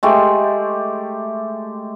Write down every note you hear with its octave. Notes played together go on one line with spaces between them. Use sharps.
G#3 A3 G4